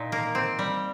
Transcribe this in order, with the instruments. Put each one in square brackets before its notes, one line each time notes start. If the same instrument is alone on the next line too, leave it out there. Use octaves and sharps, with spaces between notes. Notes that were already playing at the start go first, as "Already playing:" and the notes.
Already playing: [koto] A#2 D#4
A#3
C4
G3